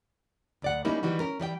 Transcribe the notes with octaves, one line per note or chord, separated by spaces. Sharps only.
D2 D5 F#5
G3 A#3 C#4 D#4 E4
D#3 E3 G3 D#4 F#4
C#4 A#4
E3 G3 D5 G5